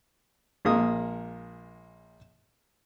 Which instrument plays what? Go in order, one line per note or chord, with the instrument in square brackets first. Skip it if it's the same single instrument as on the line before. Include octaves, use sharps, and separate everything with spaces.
[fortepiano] A#1 G#3 A#3 D#6